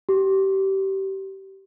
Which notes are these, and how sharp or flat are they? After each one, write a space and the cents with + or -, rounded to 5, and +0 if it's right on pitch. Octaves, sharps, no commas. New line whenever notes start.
G4 -25